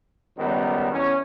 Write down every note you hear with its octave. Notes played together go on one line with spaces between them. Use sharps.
C#2 F#2 D#3 G3 B3
E2 C#4